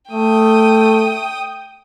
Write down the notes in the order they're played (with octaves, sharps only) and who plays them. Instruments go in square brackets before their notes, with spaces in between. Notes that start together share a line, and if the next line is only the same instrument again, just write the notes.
[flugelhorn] A3 [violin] G5 D#6